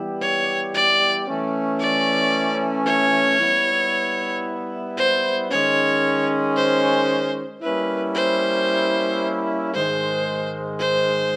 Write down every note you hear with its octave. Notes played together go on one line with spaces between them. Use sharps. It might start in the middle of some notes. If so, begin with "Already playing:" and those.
Already playing: E3 G3 B3 E4 G4
C#5
D5
E3 A3 C#4
D5
C#5
G3 B3 E4
C5
D#3 G#3 C#4 C#5
C5
G3 A#3 C#4 E4 B4
C5
G#2 D#3 G#3 C5
C5